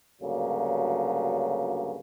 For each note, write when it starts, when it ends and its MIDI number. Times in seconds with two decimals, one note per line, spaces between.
0.22 2.00 38
0.22 2.00 43
0.22 2.00 49
0.22 2.00 54
0.22 2.00 58